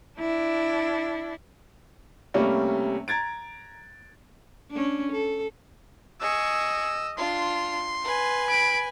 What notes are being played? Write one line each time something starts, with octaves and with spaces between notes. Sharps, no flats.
D4 E4
C3 G3 A3 A#3 C#4
A#5 G#6 A6 D7
C#4 D4
A4
G#4 D#5 C#6 E6
D4 F4 C6
B4 G#5
B5 D7